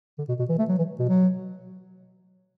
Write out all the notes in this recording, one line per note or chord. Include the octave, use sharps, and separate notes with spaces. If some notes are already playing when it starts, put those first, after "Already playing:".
D3
B2
B2
E3
A3
F#3
E3
B2
F#3